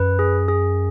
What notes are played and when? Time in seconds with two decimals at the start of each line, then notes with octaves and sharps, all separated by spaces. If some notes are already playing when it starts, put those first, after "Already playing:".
Already playing: F#2 B4
0.19 G#4
0.48 G#4